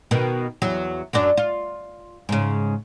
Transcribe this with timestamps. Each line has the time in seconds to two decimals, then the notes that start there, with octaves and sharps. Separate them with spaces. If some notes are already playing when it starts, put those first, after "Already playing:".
0.11 B2 D#3
0.62 E2 F#3
1.13 F#2 F#3 D4
1.37 F4
2.29 G#2 C#3